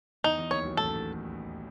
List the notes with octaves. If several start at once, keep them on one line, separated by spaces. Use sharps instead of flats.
E2 E3 D#4
E2 E3
D#2 D#3 C#5
B1 B2
A1 A2 A4
A2